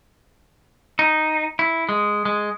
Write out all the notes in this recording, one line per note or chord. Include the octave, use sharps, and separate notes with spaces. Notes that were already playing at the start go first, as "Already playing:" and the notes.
D#4
E4
G#3
G#3